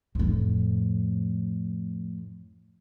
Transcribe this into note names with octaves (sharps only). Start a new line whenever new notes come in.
F2 A2